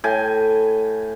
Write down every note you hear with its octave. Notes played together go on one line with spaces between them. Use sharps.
A2 G5 G#5